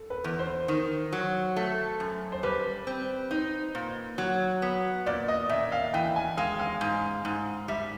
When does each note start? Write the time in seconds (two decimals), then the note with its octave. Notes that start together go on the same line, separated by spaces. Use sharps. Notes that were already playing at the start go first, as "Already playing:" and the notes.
Already playing: A4
0.10 B4
0.24 E2
0.39 C5
0.68 D#3
1.12 F#3
1.56 A3
2.00 F#2
2.32 C5
2.43 G3 B4
2.87 C4
3.31 D#4 C5
3.75 A#2
4.18 F#3
4.62 B3
5.06 A#2 D5
5.28 D#5
5.49 A#2 E5
5.72 F5
5.94 E3 G5
6.16 G#5
6.37 G#3 F5
6.59 F5
6.81 G#2
7.25 G#2
7.68 G3 E5